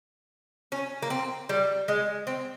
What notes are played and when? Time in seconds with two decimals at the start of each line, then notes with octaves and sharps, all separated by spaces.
0.72 C#4
1.02 A#3
1.10 C4
1.49 G3
1.88 G#3
2.27 C4